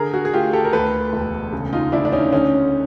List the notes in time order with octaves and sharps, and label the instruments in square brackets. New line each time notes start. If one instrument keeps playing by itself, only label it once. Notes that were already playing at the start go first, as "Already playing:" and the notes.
Already playing: [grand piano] D3 G#4 A#4
F#4 G#4
G#4
A3 F4 G4
G4 A4
A#4
D2 A4 B4
E1
C#3
D#4 F4
D2 D4 E4
D4
C#4 D#4
D3 C#4 D#4